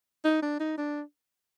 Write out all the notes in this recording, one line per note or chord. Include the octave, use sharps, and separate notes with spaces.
D#4
D4
D#4
D4